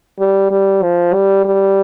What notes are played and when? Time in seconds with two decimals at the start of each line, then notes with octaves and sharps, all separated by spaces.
0.19 G3
0.51 G3
0.83 F3
1.14 G3
1.45 G3